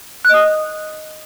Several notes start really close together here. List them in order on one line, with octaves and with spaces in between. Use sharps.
F#6 D#5 D#6